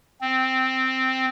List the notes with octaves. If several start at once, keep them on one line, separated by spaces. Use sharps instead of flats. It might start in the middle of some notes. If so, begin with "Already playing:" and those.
C4